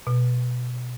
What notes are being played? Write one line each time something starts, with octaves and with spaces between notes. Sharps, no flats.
B2